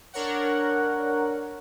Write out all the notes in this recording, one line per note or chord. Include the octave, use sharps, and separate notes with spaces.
D4 A#4 C#5 F#5